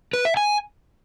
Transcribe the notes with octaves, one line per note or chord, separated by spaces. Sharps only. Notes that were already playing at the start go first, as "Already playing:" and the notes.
B4
E5
G#5